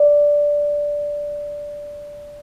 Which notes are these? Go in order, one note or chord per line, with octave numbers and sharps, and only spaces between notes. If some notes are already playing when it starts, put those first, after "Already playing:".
Already playing: D5